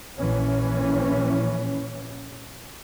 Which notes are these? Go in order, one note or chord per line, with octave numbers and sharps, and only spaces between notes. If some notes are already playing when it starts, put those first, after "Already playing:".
A#1 E3 C#4